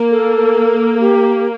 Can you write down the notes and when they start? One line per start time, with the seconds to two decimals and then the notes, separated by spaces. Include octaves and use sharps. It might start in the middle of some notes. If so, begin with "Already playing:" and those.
Already playing: A#3
0.11 A4
1.01 G4